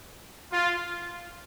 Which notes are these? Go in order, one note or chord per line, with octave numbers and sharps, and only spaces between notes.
F4